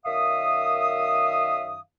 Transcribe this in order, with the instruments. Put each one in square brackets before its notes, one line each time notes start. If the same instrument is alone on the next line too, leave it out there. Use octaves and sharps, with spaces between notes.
[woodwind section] F#2 D#3 E5 F5 D#6